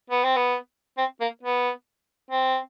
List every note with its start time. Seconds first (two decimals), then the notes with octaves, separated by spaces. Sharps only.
0.10 B3
0.24 C4
0.36 B3
0.98 C4
1.21 A#3
1.43 B3
2.31 C4